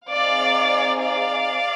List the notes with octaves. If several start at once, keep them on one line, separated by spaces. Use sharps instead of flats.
C4 D#4 G#4 D5 F5
D5 F5